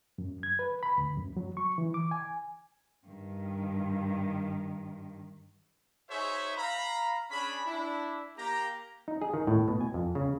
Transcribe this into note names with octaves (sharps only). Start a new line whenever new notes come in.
F#2
G#6
B4
B5
D2
F#2
F#3
C#6
E3
D6
G#5
G2 D#3
D#4 F#4 G#4 C5 C#5 E5
F5 A#5 B5
C#4 D4 G#4 B5
D4 E4
A#3 G4 A#5
D#4
G#4
D#3
A2
B2
G#5
F2
C#3